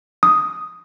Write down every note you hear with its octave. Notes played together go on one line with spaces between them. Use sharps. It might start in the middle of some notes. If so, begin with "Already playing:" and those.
D#6